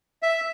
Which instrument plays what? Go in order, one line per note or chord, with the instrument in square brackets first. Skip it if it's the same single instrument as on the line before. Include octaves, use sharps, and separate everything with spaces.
[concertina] E5